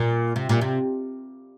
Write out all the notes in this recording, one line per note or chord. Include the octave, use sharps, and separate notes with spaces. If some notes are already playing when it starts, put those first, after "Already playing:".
Already playing: A#2
C3
A#2
C3